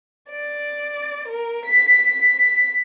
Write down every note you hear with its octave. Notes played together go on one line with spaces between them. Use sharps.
D5
A#4
B6
B6